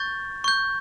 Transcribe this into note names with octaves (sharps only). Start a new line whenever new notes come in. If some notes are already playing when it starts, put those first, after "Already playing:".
Already playing: C#6 G6 A6
C#6 G6